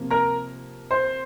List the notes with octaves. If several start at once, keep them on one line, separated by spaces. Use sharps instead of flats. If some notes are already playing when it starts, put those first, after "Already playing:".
Already playing: C3 F3 A#3
A#4 A#5
C5 C6